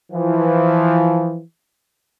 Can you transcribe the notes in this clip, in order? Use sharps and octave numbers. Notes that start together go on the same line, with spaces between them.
E3 F3